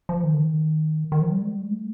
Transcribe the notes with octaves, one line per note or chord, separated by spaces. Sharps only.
F3
D#3
D3
D#3
D#3
F3
G3
G#3
G3
G#3
A3